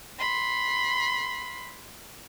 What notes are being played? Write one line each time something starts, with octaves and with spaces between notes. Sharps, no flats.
B5 C6